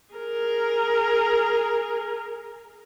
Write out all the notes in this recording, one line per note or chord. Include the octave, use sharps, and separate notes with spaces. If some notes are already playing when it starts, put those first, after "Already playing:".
G#4 A#4